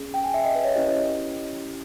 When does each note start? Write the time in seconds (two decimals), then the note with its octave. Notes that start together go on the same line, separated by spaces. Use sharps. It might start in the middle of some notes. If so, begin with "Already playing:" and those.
Already playing: C#4 G#4
0.14 G5
0.24 G#5
0.34 E5
0.45 D#5
0.55 B4
0.64 C#5
0.75 C#4 E4 G4 D#5